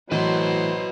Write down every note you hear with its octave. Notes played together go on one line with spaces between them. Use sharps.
A2 E3 F#3 E4 B4 C5 D#5